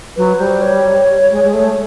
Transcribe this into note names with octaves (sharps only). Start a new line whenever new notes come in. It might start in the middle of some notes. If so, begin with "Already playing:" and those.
F#3 B4
G3 C5
C#5
G#3
G#3
A3